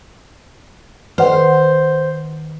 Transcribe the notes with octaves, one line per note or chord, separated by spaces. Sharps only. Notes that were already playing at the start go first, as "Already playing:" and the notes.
D#3 B4 C5 F#5